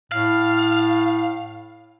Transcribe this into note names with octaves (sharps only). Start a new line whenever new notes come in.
A2 F5